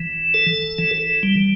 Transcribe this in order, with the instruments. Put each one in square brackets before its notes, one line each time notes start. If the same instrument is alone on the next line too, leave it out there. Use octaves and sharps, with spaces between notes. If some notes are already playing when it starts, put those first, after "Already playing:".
Already playing: [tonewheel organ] E3
A4
E3
G3